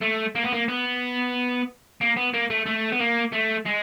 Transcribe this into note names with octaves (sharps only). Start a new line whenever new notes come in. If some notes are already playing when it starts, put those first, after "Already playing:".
A3
A#3
B3
A#3
B3
A#3
B3
A#3
A3
A3
B3
A#3
A3
G#3